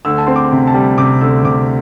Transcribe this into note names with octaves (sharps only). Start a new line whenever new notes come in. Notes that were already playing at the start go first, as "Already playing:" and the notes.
D2 E6
A5
C4 C6
D6
C3
A5
G3
C3 D6
D2 E6
C3 D6